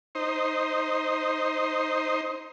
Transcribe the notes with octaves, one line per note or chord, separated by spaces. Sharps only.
D#4 C5